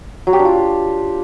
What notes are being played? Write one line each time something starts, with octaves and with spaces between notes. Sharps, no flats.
F#3
G4
D4
F4